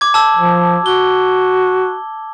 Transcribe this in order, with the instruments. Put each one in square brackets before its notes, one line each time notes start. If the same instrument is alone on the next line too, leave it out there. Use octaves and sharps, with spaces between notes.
[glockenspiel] D6 G#6
A5 E6
[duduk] F3
[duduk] F#4 [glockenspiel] G7